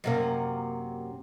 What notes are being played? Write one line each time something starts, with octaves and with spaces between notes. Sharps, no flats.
F#2 C3 A#3